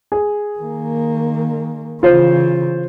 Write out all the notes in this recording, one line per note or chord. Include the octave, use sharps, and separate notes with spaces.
G#4
D#3 A#3
C#3 E3 F4 C5